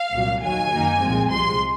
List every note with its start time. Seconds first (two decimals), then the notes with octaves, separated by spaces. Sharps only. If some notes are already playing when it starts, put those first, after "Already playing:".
Already playing: F5
0.13 C2 A#2 F#3
0.42 D#2 D#3 F#3 G#5
0.72 F#2 D#3 A#3 D#4
1.01 C2 A#2 F3 G#3 C4
1.30 C2 C3 F3 G#3 C6